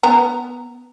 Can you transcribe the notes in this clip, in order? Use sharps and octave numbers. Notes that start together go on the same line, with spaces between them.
B3 A#5